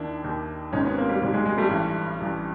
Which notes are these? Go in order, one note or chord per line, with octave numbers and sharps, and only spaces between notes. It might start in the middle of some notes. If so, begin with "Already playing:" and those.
Already playing: D#2 D#3 D4 E4
D#2 D#3
G#1 G#2 D#3 C#4 D#4
B3 C#4
A#3 C4
G3
G#1 G#2 D#3 G3
G#3
G#3
G3 A3
A1 G2 E3
A1 G2 E3